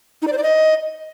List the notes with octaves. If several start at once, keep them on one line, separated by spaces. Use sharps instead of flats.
D#4
D5
C5
D5
D#5